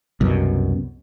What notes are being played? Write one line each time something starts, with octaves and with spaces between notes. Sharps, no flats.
C2 F#2 B2